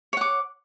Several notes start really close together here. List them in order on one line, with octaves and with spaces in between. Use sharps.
C#5 F#5 D6